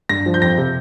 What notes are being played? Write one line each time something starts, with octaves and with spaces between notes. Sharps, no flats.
G2 A#6
F3
G6
F2 A#6
C3